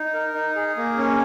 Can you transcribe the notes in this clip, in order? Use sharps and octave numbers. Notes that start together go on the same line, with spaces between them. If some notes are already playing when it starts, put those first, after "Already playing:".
Already playing: D#4
A#4
D#4
G#4
A#3
C#4